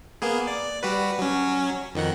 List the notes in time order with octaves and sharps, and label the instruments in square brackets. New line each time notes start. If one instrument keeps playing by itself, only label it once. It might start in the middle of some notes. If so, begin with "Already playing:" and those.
[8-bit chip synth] A#3 B3 G#4
D5
G3 F#4 B4
F#3 C#4
F2 D#3 F#5